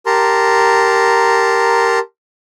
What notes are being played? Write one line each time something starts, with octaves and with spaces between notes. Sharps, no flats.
G4 A#4 A5 A#5 C6